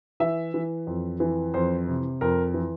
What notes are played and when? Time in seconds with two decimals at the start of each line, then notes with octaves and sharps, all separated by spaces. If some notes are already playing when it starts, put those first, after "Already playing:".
0.20 E3 E5
0.54 E3
0.87 F2
1.20 E3
1.54 F2 C5
1.88 C3
2.21 F2 A#4
2.54 E3